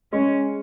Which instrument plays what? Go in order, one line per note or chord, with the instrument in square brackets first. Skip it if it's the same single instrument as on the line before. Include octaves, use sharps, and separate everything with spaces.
[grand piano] G#3 [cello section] C#4